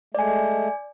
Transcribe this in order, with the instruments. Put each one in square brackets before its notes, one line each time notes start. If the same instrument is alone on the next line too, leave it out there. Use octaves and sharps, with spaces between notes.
[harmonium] G#3 A3 [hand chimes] D5 G#5